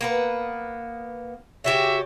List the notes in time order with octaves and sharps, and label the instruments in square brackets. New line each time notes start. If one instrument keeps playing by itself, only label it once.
[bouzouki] A#3 B3 B4
[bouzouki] C#3 F#4 G4 [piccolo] E5